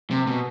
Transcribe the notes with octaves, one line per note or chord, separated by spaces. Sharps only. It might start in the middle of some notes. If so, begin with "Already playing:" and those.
C3
B2